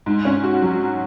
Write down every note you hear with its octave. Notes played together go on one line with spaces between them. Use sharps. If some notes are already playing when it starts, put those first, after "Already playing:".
G#2
C#4
F#4
F#3